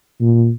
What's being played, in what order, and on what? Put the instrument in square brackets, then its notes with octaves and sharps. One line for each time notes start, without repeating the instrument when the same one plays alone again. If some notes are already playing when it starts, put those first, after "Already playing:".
[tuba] A#2